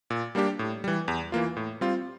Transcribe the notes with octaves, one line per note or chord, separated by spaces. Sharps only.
A#2
G3 A#3 D4 G4
A2
E3 G3
E2
E3 A#3 F4
A2
G3 C4 F4